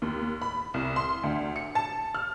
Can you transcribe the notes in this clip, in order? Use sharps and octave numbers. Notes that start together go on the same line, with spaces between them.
D#2
B5
C2
C6
D2
C#7
A5
F6